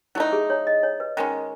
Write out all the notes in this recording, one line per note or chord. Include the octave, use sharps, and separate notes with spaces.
F#3 A3 D#4 E4
G#4
C#5
D#5
C#5
B4
D#3 G#3 C#4